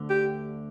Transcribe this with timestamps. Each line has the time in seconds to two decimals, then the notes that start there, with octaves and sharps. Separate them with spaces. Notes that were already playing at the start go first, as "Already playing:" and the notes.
Already playing: D2 D3
0.10 G4